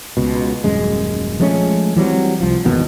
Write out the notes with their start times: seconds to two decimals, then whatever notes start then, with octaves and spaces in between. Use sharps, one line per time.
0.17 C#2 B2
0.64 D#1 F#2 G#3
1.40 F3 G#3 A3 C#4
1.96 E3 F#3 G3 C4
2.40 C2 F3
2.65 G#1 E2 B2 D#3